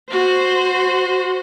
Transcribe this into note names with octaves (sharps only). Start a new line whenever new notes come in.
F#4 C5